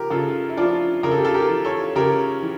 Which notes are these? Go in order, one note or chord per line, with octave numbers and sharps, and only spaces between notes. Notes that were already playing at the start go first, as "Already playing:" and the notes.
Already playing: C#3 F3 G4 A#4
C#3 F4 A4
E4
F3 D4 F4
C#3 A#4
A4
G4
F4 A4
G4 A#4
E3
A4 C#5
C#3 G4 A#4
E3